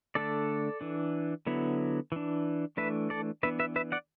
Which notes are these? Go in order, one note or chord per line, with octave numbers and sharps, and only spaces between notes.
D3 A3 D4 A4 D5
E3 D4
D3 F#3 B3 E4
E3 D4
E3 A3 D4 B4 E5
A4 D5
E3 B3 D4 B4 E5
B4 E5
B4 E5
D5 F#5